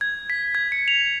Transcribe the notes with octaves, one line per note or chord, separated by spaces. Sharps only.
G#6
B6
G#6
C#7
F7